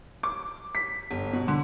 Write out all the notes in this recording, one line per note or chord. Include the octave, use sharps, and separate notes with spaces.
D6
B6
G1
B2
D3